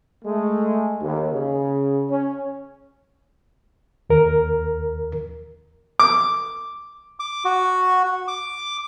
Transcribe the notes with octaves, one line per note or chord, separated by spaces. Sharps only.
G#3 A3
D#2
C#3
C#4
D#2 A#4
D6
D6
F#4
D6